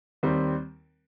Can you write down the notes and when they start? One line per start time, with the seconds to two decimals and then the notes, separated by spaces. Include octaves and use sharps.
0.23 D#2 D#3 G3 C4